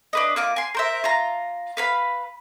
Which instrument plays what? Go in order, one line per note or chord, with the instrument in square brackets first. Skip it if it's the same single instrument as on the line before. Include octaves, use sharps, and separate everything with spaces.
[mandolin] D4 B4 D#5
A#3 F4 D6
G#5 C6
A#4 C5 E5
F4 A#5
B4 F5 B5